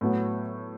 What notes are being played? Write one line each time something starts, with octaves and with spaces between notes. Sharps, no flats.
A2 F#3 B3